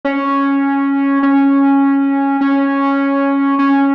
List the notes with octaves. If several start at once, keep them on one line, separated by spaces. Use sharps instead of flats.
C#4
C#4
C#4
C#4